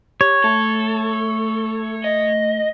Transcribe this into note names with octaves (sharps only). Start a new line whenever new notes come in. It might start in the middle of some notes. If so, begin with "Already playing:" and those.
G4 C#5
A3 A4
D#5